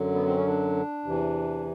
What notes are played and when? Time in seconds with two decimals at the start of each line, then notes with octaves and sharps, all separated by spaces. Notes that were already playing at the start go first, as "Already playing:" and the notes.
Already playing: F#2 D3 F#3
0.14 B3
0.26 C4
0.36 C#4
0.47 D4
1.04 E2 C3 E3